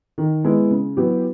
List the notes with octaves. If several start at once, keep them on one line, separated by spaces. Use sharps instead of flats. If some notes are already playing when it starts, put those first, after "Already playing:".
D#3
G#3 B3 E4
C#3
F#3 B3 E4 G4